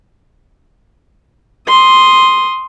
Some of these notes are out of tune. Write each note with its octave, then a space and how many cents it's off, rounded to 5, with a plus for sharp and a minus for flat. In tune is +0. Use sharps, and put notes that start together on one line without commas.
C6 +0 D#6 +0